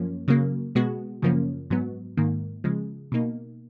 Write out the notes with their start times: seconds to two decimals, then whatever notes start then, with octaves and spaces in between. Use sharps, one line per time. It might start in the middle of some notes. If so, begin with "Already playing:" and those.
Already playing: F#2 F3 A#3 C#4
0.28 C#3 F#3 A#3
0.75 B2 G#3 B3 F#4
1.22 F#2 C#3 F3 A#3 C#4
1.70 G#2 F#3 B3
2.17 G#2 D#3 A#3
2.64 C#3 F3 G#3
3.12 B2 A#3 D#4